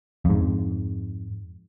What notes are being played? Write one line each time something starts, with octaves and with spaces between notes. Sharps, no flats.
F2 G#2